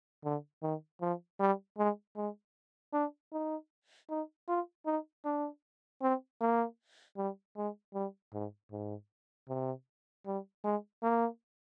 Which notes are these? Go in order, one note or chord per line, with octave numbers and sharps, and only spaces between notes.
D3
D#3
F3
G3
G#3
G#3
D4
D#4
D#4
F4
D#4
D4
C4
A#3
G3
G#3
G3
G#2
G#2
C3
G3
G#3
A#3